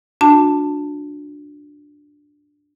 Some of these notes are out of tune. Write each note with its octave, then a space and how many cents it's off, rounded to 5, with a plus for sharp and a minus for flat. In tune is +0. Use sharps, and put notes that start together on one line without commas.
D4 +0 F#4 -40 A5 +10